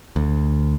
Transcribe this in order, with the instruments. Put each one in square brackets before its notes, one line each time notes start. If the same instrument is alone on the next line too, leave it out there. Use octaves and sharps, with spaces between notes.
[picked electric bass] D2